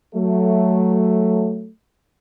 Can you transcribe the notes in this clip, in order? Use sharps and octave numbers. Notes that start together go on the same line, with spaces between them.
F#3 A3